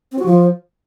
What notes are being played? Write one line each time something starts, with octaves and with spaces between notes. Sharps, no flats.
C4
F#4
F3